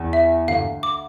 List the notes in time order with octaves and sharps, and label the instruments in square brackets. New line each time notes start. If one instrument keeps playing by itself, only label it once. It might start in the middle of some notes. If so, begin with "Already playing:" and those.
Already playing: [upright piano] E2 E3
[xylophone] E5
[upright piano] D2 D3 [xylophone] F5
[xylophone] D6